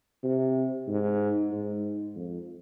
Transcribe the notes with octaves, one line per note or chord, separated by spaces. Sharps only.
C3
G#2
G#2
F2